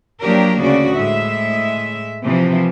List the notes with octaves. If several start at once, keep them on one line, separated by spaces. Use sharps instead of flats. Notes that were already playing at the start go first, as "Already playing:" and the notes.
F3 F#3 A#3 D4 G4 A#4
D2 C#3 F#4 D5
A2 G#3 E5
C3 E3 F3